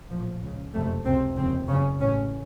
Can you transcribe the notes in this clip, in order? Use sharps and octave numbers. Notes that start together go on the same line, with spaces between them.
A#1 A2 F3
C#2 C#3
F#1 F2 C3 A3
C#2 C3 C4
F1 D#2 C#3 C4
F#1 F#2 C#3 C#4
A1 A2 C#4